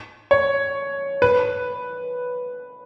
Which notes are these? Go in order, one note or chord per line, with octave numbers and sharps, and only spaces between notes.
C#5
B4